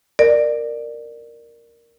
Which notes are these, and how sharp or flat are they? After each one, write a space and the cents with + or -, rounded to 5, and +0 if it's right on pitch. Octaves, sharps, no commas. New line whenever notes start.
A#4 +0 D5 +20